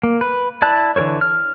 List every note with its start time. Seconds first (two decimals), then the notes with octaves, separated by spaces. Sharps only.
0.03 A#3
0.21 B4
0.62 E4 D5 A5 F#6
0.96 D3 E3 A#4 C5 C#5
1.21 F6